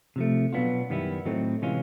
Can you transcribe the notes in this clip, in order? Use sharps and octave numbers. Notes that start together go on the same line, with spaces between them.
C3 F3 A3
B2 F#3 B3 D4 F4
F#2 D#3 G3 B3 E4
A2 F#3 A3 C4 D#4
C3 E3 G#3 C#4 F4